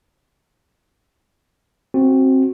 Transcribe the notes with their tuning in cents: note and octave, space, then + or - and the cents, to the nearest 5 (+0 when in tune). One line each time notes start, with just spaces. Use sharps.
C4 +15 F#4 +0